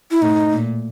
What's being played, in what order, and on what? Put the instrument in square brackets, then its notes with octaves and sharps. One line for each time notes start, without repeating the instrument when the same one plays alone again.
[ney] E4
[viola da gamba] A2 [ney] D#4
[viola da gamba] A#2